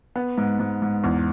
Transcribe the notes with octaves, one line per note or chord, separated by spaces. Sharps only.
B3
G#2
G#2
G#2
E2